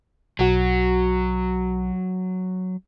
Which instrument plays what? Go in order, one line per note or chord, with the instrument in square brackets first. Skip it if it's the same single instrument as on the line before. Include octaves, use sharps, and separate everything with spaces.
[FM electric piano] B1 F#4 [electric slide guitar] F#3